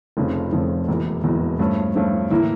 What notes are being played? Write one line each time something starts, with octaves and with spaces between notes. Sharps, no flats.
F1 F2 C#3 F3
F1 F2 C#3 F3
E1 E2 E3 A#3
E1 E2 E3 A#3
G2 F3 A3 C#4
G2 F3 A3 C#4
A2 E3 A#3 E4